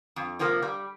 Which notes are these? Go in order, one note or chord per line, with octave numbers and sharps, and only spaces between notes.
F2
C3 F3 A#3
G3